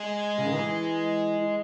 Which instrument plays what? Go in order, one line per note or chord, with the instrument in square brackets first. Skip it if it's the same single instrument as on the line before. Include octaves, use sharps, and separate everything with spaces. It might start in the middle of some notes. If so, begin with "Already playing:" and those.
Already playing: [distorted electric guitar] G#3
[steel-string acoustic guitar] C#3
D#3
E3